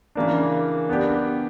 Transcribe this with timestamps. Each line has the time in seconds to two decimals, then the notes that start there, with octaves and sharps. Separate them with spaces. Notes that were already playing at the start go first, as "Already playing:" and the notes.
0.15 C#3 E3 A#3 D4
0.89 B3 D4 G4